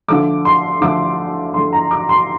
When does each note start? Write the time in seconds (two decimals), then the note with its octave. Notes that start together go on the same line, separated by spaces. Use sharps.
0.08 D3 F3 A3 D6
0.45 C6
0.81 D3 F3 A3 D6
1.54 D3 F3 A3 C6
1.73 A#5
1.91 D6
2.09 C6